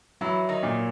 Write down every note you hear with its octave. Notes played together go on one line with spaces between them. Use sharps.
E3 F#3 E4
D#3 D#4
A#2